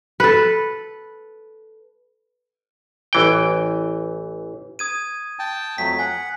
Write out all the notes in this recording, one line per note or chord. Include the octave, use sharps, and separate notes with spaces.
A4 B4
A1 E3 G5
D#6 G#6 D#7
G5 A5
F2 F#3 A3 B6
F#5 G#5